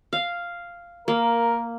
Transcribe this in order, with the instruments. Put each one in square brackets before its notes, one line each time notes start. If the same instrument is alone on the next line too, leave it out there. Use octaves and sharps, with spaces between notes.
[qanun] F5
[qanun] A#3 [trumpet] A#4